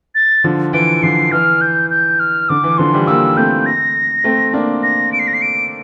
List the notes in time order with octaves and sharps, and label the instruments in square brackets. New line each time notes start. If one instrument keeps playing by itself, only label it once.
[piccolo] A6
[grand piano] D3 F3
[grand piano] E3 [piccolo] D7
[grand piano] D3 F3 [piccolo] C7
[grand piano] E3 [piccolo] F6
[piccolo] G6
G6
F6
[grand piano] D3 [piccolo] D6
[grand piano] E3
[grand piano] D3 F3 [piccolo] C6
[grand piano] E3 G3
[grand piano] G3 A#3 [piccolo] E6
[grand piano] A3 C4 [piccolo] G6
[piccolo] A#6
[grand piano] A3 C4
A#3 D4
[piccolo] A#6
D7
C7
A#6
C7
D7